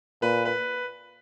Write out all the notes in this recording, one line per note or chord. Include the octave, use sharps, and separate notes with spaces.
A#2 B4
B4